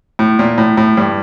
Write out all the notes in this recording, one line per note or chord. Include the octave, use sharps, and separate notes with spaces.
A2
A#2
A2
A2
G2